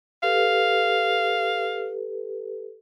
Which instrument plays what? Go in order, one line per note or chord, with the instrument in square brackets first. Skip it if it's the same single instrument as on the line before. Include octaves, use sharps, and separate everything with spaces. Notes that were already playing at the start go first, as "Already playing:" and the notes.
[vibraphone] G4 A4 B4 [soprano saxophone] F5